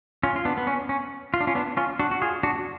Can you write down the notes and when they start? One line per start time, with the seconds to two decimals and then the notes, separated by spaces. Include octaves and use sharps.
0.23 C#4 F4
0.36 F4
0.45 B3 D4
0.58 B3
0.67 C#4
0.89 C#4
1.34 F4
1.41 D4
1.47 C#4 F4
1.55 B3 D4
1.77 C#4 F4
1.99 D4 F#4
2.11 F#4
2.22 F4 G#4
2.43 D4 F#4